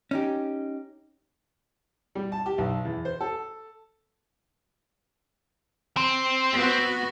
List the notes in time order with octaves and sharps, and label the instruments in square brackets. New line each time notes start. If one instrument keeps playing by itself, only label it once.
[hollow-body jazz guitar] C#4 D#4 G4
[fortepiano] G3
A5
G4
B1
E2
C5
A4
[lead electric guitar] C4
[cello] B3 F#4